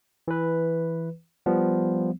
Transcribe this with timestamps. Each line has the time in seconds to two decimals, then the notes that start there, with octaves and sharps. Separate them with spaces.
0.28 E3 B4
1.46 F3 G3 B3